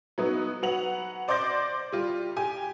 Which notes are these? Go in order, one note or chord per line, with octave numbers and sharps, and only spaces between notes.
F#3 B3 D#4
F#3 B4 F#5 F7 F#7
C5 D5 C6 D6 G6 A#6
G3 F4
G4 G#5